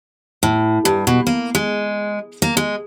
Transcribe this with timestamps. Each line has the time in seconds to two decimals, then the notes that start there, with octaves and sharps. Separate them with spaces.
0.43 A2
0.85 G2
1.07 B2
1.27 A#3
1.55 G#3
2.42 A#3
2.57 G#3